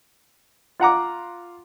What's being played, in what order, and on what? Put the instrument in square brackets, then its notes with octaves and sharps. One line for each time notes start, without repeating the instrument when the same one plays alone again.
[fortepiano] F4 F#5 A#5 D6